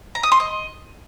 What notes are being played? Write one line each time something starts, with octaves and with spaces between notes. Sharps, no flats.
A#5
D#6
C6
D#5